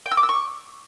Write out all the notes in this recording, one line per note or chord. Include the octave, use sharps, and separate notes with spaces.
G5
E6
D6
E6
C#6